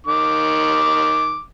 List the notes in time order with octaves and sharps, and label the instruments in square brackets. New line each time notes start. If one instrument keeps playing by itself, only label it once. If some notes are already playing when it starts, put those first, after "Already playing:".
[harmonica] D#3 D6